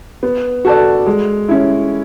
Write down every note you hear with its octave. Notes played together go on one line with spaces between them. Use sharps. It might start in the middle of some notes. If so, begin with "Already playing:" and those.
B3
F#4 A4 D5
G#3
C#4 E4